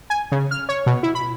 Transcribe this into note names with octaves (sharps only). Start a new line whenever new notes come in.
G#5
C#3
F6
C#5
B2
E4
B5